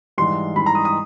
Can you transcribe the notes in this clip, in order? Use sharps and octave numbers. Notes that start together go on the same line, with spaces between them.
G#2 E3 G3 C6
G#2 E3 G3 B5
A#5
D#6
D#6